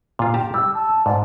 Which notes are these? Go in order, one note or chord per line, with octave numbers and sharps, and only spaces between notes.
A#2 F4
G4 G5 A5 A#5
G3 E6
A5
G#2 D5